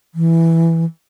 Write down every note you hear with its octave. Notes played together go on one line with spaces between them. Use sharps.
E3